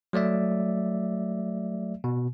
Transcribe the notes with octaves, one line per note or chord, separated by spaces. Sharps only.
F#3 A3 D5 E5
B2